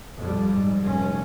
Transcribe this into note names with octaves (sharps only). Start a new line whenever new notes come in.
F2 G3
G#2
F1 C#4